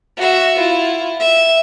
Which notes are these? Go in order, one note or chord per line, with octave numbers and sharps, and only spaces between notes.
F#4 E5
E4 F4
E5